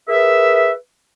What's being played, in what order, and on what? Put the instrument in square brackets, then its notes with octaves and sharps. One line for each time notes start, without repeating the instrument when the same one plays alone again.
[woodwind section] G#4 A#4 B4 E5